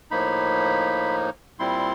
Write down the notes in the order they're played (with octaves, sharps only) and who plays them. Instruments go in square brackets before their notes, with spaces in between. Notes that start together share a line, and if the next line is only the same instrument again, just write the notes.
[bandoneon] A2 F3 A#3 D#4 B5
A#2 G3 C4 E4 C6